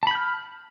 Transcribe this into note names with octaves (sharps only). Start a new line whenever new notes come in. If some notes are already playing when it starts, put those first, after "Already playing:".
A5 B5 F6 G6